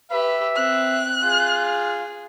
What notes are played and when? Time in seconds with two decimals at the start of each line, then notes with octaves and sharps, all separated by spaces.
0.11 G4 B4 E5
0.56 C4 F#6
1.23 F4 G#4